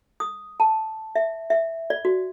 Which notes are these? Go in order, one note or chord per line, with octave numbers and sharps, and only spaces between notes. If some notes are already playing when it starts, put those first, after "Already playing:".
D#6
A5
E5
E5
D5
F#4